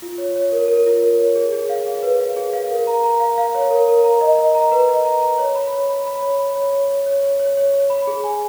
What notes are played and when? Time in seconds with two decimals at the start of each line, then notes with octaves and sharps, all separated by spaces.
0.02 F4
0.18 C#5
0.36 C#5
0.52 A#4
0.68 A#4
0.86 F4
1.03 A#4
1.19 C#5
1.36 G#4
1.52 G#4
1.69 F5
1.86 G#4
2.02 B4
2.20 F5
2.36 G#4
2.53 F5
2.71 A#4
2.87 A#5
3.03 A#5
3.20 F5
3.38 F5
3.55 C#5
3.70 A#4
3.88 A#4
4.04 A#5
4.21 D#5
4.38 D#5
4.55 A#5
4.72 B4
4.89 D#5
5.05 A#5
5.22 A#5
5.38 C#5
5.55 B5
5.73 C#5
5.89 B5
6.06 B5
6.22 C#5
6.39 B5
6.56 C#5
6.73 C#5
6.90 C#5
7.06 C#5
7.23 C#5
7.40 C#5
7.57 C#5
7.74 C#5
7.90 B5
8.07 G#4
8.24 G#5